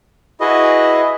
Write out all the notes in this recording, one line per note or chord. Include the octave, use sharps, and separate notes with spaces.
E4 F#4 G#4 B4 D#5